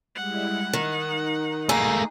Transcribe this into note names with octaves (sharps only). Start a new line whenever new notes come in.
G3 G#3 E4 F#5
D#3 D#4
A3 A#3 G#4